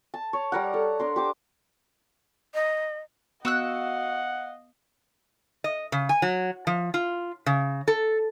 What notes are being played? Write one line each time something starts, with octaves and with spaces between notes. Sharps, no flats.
A5
C#5
G3 A#4 F#5
A4
D4 A#4 C6
G4 C5 D6
D#5
B3 F#4 D#5 F5 F#5 E6 F#6
D#5
C#3
G#5
F#3
F3
F4
C#3
A4